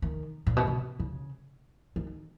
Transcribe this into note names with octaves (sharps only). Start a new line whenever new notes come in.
D#3
A#2
B2
C#3
C#3
D#3